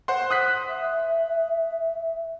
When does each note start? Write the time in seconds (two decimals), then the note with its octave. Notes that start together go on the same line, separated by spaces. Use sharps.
0.08 C5 F#5 C6
0.31 D#6 F#6 B6
0.69 E5